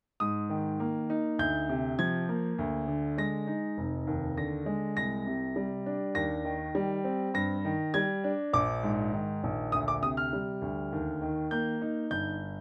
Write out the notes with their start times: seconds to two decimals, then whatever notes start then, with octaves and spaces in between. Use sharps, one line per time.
0.20 G#2 D#6
0.50 D#3
0.80 A#3
1.10 D#4
1.39 D2 G6
1.69 C3
1.99 F3 G#6
2.29 A#3
2.58 D2
2.88 D3
3.18 G#3 A#6
3.47 D#4
3.77 F1
4.07 D#2
4.38 D3 A#6
4.66 G#3
4.97 C2 A#6
5.27 C3
5.56 G3
5.86 D4
6.15 D#2 A#6
6.45 D#3
6.75 G3
7.04 C4
7.34 G2 A#6
7.65 D#3
7.94 G3 G#6
8.24 D4
8.53 A#1 D6
8.83 G#2
9.13 D#3
9.44 A#1
9.72 D2 D#6
9.88 D6
10.02 C3 D#6
10.17 F6
10.33 G3
10.62 D2
10.93 D#2
11.22 D#3
11.51 A#3 G6
11.82 D#4
12.11 G1 G6